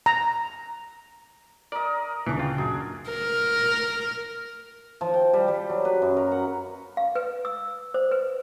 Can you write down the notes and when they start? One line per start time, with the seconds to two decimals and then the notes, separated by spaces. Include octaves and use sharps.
0.06 A#5
1.72 A#4 D5 D#5
2.26 D2 A#2 C#3 E3 C#4 D4
2.39 F4 G5
2.58 F#2 G#4
3.09 A#4
5.01 F3
5.14 G5
5.33 G3
5.48 G3
5.69 F#3
5.85 B4
6.02 F#2
6.17 A#4
6.32 F#5
6.97 F5
7.16 B4
7.45 E6
7.94 C5
8.11 B4